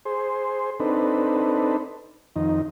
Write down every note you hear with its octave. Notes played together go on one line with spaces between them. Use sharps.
G#4 C5
C4 D4 D#4 A4 B4
F2 D#3 D#4